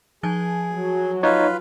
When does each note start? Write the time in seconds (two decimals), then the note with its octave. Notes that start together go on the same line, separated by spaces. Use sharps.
0.23 F3 G#4 G#5 A5
0.73 F#3
1.23 D#4 F4 B4 C#5